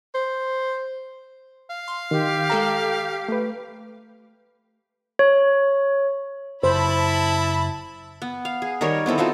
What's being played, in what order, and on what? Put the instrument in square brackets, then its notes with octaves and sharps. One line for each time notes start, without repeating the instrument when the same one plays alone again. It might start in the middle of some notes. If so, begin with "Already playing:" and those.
[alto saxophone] C5
[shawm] F5
[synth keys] C6
[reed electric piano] D#3 [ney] G4
[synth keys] G#3 A4 G5 [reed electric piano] A#5
[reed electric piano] A3 B4
[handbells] C#5
[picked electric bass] F#1 [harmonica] E4 [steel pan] C5 [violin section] A5 B5
[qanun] B3
F5
G#4
D#3 G3 A#4 C#5
B3 C4 E4 A4
D#4 F4 F#4 A4